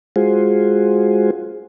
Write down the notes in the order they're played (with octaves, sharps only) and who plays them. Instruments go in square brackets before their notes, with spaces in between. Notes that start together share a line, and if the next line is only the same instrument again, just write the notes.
[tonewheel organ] G#3 F4 F#4 G#4 C5